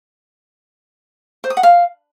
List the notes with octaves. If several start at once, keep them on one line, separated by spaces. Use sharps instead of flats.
C5
D#6
F#5
F5